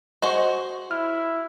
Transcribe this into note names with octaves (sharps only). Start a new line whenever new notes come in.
F#4 G#4 C5 D#5 C#6
E4 F6